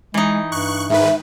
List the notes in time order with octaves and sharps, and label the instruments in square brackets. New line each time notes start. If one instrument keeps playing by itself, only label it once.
[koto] E3 D#4 [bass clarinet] G#3
[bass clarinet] G2 [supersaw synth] C#6 F#6
[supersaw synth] G#2 D#3 B4 [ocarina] E5